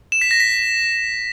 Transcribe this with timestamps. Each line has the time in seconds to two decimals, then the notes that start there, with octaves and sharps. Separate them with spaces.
0.12 E7
0.21 B6
0.31 A#6
0.40 B6